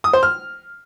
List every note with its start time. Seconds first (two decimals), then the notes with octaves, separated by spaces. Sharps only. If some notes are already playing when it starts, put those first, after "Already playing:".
0.04 D#6
0.13 C5
0.23 F6